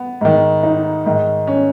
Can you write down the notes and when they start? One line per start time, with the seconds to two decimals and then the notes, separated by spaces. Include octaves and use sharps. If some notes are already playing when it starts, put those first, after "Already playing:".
Already playing: B3
0.21 G#2 D#3
0.63 D#4
1.06 G#2 D#3
1.47 C#4